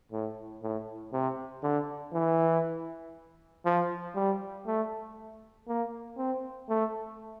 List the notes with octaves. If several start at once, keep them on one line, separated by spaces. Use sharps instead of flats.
A2
A2
C3
D3
E3
F3
G3
A3
A#3
C4
A3